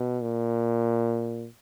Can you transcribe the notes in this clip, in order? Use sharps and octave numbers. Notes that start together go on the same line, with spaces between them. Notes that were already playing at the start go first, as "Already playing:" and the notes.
Already playing: B2
A#2